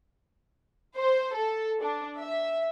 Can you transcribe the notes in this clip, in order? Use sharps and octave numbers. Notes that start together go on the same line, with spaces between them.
C5
A4
D4
E5